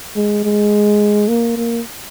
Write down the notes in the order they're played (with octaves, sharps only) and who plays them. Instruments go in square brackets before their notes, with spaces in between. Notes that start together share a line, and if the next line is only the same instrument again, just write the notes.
[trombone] G#3
G#3
A#3
A#3